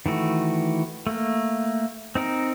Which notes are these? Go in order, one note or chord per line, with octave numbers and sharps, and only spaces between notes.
D#3 E3 A3 F#4
A3 A#3
C4 D#4 A#4